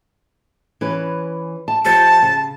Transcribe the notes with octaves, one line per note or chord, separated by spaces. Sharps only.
E3 C#4 B4
A5
F3 G4 C5 A5
C#3